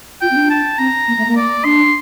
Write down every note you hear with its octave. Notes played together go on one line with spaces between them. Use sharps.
F4 G5
C4
D4
A5
C4 A#5
A#3
A3
A#3
D5
D4 C6